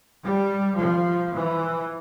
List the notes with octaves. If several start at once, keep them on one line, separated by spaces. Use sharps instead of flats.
G3
F3
E3